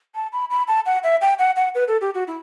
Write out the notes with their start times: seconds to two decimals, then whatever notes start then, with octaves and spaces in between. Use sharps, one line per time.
0.15 A5
0.33 B5
0.50 B5
0.68 A5
0.86 F#5
1.04 E5
1.21 G5
1.39 F#5
1.56 F#5
1.75 B4
1.88 A4
2.01 G4
2.14 F#4
2.27 E4